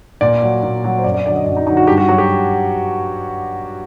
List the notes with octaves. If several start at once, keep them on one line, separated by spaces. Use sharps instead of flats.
A#2 D5
F#3
A#2
F#3
C5
F#2 D5
D5
D3 F#3 D5
D#5
F#2 D5
D#4
D3 F#3 D#4
F#4
G2 G4
F#4
F#3 F#4
G4